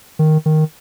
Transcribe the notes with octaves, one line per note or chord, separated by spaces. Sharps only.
D#3
D#3